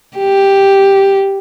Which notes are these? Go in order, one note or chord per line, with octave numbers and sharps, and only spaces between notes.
G4